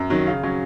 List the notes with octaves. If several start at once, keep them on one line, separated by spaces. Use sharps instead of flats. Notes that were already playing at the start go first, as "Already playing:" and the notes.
Already playing: F#2
D#3 F#3
C#3 F5
F#3 C#4